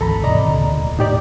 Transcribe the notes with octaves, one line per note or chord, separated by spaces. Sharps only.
G#1 D2 E3 A4 A#5 B5
D#2 G#2 C3 D5 D#5 A#5
D2 A#2 D3
E1
A2 D#4 G4 D5